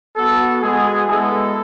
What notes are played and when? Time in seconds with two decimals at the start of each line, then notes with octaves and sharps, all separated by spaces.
0.16 B3 F#4 A4
0.62 G#3 B3 F#4 G#4
1.07 G#3 B3 E4 A4